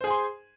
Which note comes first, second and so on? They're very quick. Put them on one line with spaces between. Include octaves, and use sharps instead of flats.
C5 G#4 G#5 C6